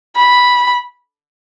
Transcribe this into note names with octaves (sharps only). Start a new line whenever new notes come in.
B5